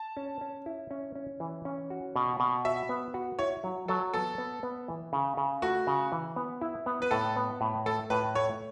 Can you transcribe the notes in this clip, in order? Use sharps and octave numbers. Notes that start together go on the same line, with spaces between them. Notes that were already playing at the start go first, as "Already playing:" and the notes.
Already playing: A5
C#4
C#4
E4
C#4
C#4
E3
C#4
F#4
B2
B2
F#4 E5
B3
F#4
E4 C#5
F#3
F#3 A4
B3 A4
B3
B3
E3
C#3
C#3
A3 F#4
C#3
E3
B3
E4
B3
B4
A2 A4
B3
A2
A3 A4
A2 B4
A3 C#5